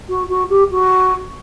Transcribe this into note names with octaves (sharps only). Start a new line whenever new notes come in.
F#4
F#4
G4
F#4